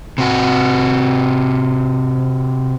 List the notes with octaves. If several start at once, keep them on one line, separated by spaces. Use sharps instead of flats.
C3 F#4